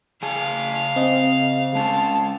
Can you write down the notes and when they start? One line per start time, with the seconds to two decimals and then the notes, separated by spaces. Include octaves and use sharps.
0.23 C#3 G#4 F5 G#5 A5
0.96 C4 D#5
1.75 G#3 C#4 A5